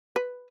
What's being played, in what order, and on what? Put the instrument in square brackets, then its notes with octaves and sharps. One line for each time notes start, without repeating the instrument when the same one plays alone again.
[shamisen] B4